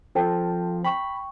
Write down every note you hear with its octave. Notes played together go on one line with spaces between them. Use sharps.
F3 C4 A4 G5 A5
G5 B5 C#6